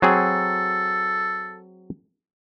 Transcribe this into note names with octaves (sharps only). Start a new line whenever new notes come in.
F#3 C4 G#4 A4